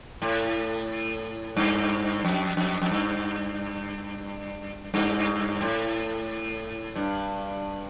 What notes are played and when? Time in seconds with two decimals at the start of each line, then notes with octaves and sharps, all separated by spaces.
0.22 A2
1.56 G2
2.24 F2
2.57 F2
2.82 F2
2.91 G2
4.94 G2
5.61 A2
6.95 G2